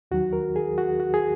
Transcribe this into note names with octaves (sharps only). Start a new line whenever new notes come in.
D#2 D#3 F#3 F#4
A#4
G#4
F#4
F#4
G#4